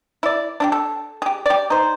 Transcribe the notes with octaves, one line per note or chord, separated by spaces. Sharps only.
E4 D5
D4 E4 G4
A4
G4 G#4
G4 D5
D#4 C5